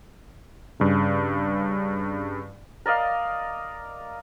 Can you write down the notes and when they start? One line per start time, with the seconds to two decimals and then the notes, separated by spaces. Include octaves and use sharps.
0.80 G2 C#3
2.86 A#4 D5 D#5 F5